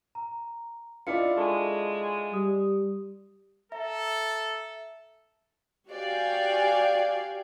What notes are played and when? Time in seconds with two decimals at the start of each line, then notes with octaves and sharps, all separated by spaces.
0.15 A#5
1.07 D4 E4 F4 D#5 C#7
1.37 G#3 A4 A5 C#6
2.34 G3 D#6
3.72 A4 E5 A#5 A#6
5.90 F#4 G4 D5 F5 G5 G#5